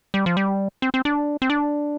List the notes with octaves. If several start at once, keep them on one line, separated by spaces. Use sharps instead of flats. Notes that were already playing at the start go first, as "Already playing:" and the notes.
G3
F3
G3
C4
C4
D4
C4
D4